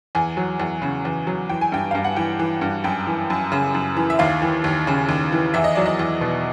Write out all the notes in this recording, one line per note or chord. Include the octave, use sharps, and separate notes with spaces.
E2 G#5
F#3
E2
C#3
E2
F#3
E3 G5
G#5
G2 G5
G2 F5
F#5
E3 G5
E3
G2
F#2 G5
E3
F#2
C#3
F#2
E3
E5
D#2 F5
E3
D#2
C#3
D#2
E3
E2 E5
D#5
F#3 D5
D#5
E2
B2